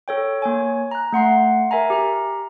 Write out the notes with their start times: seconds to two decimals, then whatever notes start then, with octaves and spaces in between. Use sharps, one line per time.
0.08 A4 C#5 G5
0.42 A#3 C#5 G#5
0.91 A#5 F#6
1.12 A3 F#5 C6 C7
1.71 A#4 E5 G#5 A#5
1.90 G4 A#5